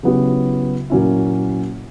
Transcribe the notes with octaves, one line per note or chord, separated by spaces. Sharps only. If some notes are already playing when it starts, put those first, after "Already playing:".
C#3 F#3 B3 E4 G4
A#2 F#3 A#3 C#4 E4